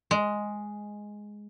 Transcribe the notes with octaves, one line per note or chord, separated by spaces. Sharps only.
G#3